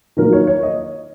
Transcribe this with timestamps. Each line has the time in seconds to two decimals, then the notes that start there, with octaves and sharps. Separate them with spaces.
0.17 D#3 F#3 A#3 A#4
0.33 C#5
0.47 C#5
0.63 D#5